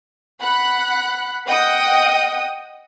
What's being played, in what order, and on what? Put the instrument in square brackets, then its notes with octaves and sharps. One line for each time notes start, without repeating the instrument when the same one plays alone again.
[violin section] F#5 B5 F#6
D#5 F#5 G5 D#6